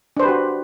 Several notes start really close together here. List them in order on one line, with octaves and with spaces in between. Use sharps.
D4 C5 B4 G4 F#4